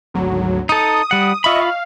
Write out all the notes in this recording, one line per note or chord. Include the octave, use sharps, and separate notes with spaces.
G#1 D2 F#3
D#4 A4 D#6
G3 F#5
F4 D#5 E5 B5 C#6
F5